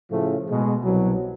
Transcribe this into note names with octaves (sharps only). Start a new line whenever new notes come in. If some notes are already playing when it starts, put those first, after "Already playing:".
A2 C#3 F3 A3
B2 G#3
C2 B2 F#3